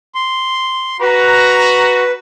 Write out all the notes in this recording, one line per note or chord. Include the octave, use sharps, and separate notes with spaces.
C6
F#4 B4 A#5